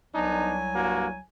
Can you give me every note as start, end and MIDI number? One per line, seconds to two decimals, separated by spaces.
0.15 1.19 36
0.15 1.19 54
0.15 0.58 59
0.15 0.58 62
0.15 0.58 63
0.15 1.19 80
0.76 1.08 43
0.76 1.08 58
0.76 1.08 66